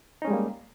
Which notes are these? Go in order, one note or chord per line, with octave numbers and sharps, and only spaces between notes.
G3 G#3 A#3 C#4 D#4